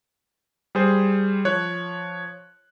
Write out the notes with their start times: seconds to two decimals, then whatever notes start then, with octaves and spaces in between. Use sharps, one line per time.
0.75 G3 G#4 C5
1.45 F3 C#5 F#6